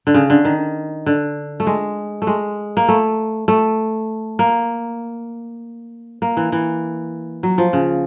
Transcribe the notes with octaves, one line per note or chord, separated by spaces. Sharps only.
D3
C#3
D3
D#3
D3
A3
G#3
A3
G#3
A#3
A3
A3
A#3
A#3
E3
E3
F#3
F3
C#3